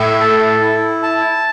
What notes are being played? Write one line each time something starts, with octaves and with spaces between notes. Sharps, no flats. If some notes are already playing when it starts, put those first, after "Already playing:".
Already playing: A2 E5
A4
E4
A5